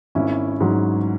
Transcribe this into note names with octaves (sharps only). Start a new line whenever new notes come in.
G#1 C#4 E4
G#2 F#3